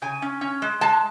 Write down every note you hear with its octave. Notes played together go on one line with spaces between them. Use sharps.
C#3 G#5
C#4
C#4
G#3
G#3 A5